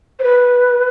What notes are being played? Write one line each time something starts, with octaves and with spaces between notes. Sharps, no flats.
C5
B4